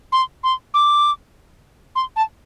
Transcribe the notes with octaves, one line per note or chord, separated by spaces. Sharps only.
C6
C6
D6
C6
A5